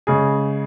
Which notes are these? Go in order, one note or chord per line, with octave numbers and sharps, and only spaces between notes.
C#3 G#3 G#4